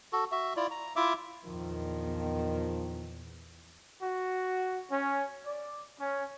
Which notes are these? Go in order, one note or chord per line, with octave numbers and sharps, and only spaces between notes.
F#4 A4
F#4 E5
E4 F4 D5
A#5
E4 F4 E5 D6
A#1 E2 D#3 F3
F#4
C#4
D5
C#4